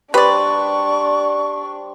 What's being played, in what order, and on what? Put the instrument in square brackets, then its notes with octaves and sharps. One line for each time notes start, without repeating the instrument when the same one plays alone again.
[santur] G3 C5 C6 [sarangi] D4 [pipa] B4 D5 [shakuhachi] C#6